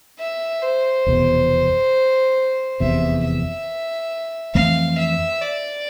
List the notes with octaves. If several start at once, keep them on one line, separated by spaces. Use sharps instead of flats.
E5
C5
F1 E2 B2
F1 E2 C3 E5
E5
F2 E3 A3 C4 F5
E5
D5